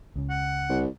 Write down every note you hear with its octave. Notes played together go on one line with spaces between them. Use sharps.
C#2 C#3
F#5
C2